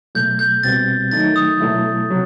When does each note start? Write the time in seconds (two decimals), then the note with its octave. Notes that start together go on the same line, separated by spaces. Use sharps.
0.15 B2 F#3 A3 G6
0.39 G6
0.63 C2 B2 G3 C4 F#4 A6
1.12 D#3 F#3 A3 D#4 A6
1.36 D#6
1.61 B2 F#3 A3 E4
2.10 C3 F#3